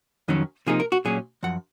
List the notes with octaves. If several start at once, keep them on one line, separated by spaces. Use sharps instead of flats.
F2 D#3 F#3 C#4
C3 F3 A#3 D#4 G#4
A#4
F#4
A#2 F#3 C#4 G#4
F#2 F3 F#5